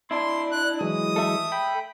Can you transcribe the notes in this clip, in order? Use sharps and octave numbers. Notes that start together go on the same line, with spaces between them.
D4 E4 C6
F#6
E3 F#3 G#3 D#6
A4 E5
G5 B5